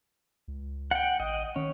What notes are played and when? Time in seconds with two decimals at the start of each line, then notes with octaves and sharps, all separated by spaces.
0.48 C#2
0.91 F#5 G5
1.20 A1 D#5
1.56 D#3 C#4